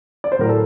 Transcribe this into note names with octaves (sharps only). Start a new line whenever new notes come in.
D5
C5
A2 F#3 A#4
A4